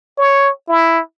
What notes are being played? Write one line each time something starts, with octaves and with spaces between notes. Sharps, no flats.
C#5
E4